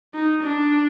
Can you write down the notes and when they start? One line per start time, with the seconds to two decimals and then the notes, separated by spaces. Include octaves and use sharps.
0.14 D#4
0.43 D4